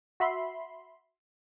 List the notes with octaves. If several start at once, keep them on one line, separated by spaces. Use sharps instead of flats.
F#4 E5 B5 C6